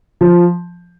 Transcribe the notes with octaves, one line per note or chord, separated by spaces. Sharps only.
F3